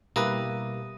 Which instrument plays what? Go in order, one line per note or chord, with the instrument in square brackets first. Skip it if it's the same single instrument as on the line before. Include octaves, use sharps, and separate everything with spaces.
[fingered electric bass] B2 [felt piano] G3 [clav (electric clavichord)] A#3 E4 B4 [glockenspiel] D#6 A#6 D#7